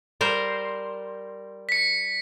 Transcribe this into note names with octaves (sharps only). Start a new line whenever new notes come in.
G3 A#4 C5
B6 C#7